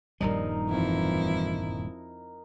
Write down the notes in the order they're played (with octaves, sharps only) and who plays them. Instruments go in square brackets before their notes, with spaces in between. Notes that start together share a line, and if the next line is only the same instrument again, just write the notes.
[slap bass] D#1 G2 F3 [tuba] G3 [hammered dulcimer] D#4 A#4
[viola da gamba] F2 E4 [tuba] E3